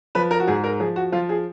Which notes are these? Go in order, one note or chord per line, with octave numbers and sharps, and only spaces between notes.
F3 B4
A#4
F#4
G#2 G#4
A#4
F3 G#4
F#4
F3 F4
G#4